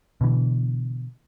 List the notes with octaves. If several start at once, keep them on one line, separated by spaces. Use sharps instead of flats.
B2 D3 E3